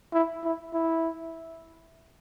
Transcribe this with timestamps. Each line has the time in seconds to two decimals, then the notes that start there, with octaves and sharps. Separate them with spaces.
0.13 E4
0.44 E4
0.73 E4